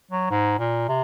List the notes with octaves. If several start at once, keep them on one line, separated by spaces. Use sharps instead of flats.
F#3
G#2
A#2
C3